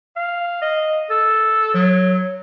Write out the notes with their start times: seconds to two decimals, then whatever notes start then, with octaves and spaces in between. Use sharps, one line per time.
0.16 F5
0.62 D#5
1.10 A4
1.74 F#3